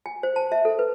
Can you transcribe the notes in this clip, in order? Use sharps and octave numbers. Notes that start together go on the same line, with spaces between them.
G#5
C5
A5
E5
A4
B4